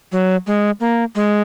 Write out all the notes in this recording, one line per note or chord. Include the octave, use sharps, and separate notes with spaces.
F#3
G#3
A#3
G#3